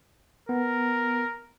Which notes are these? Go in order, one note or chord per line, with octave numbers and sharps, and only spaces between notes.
B3 A#4